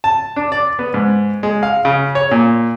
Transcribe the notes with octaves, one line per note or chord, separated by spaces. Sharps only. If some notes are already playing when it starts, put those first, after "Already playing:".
A5
D4
D5
B3
G#2
G#3
F5
C#3
C#5
A#2